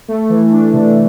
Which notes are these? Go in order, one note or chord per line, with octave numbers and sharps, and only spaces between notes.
A3
E3
D4
C3